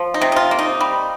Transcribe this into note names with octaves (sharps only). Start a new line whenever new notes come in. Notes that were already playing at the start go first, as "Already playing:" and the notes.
Already playing: F3
D#4
C3
D#4
F4
A#3
D#4
G3